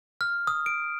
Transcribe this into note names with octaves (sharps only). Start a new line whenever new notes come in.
F6
D#6
D7